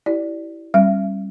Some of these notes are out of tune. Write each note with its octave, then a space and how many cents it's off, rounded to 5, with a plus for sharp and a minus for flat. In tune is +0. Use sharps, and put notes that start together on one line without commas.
E4 -5 G4 -30 D5 +0
G3 +0 C#4 -40 E5 +40